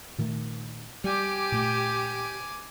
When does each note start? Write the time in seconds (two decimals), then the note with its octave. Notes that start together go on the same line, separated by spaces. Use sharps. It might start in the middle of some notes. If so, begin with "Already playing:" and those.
0.18 A#2 D#3 A3
1.04 G3 G4 G#5 D6
1.52 A#2 A3